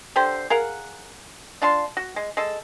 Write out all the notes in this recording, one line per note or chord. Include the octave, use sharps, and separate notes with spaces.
D3 G4 A4 C5
G#4 A#4 F5 F#5
D4 F4 A5 C6
F#4
G#3
G#3 A4